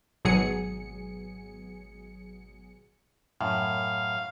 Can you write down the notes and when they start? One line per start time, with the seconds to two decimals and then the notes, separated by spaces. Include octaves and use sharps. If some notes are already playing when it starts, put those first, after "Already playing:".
0.25 G#1 B2 F#3 G#4 C#7
3.41 F#2 A2 F5